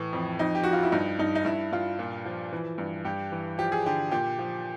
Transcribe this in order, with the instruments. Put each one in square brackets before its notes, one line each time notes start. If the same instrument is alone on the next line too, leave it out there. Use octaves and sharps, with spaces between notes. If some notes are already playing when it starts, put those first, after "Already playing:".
Already playing: [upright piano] A2 E3
F2
F2 D#4
G4
F3 F#4
F4
E4
G2 D#4
G2 D#4
D#4
G2 E4
G2 F4
A#2
F3
E3
G2
G2 G4
E3
F3 G4
G#4
D3 G4
A#2 G4
F3